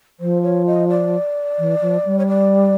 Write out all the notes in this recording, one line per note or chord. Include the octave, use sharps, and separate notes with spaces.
F3 C5
C#5
D#5
D5
E3
F3
G3
C#5
D5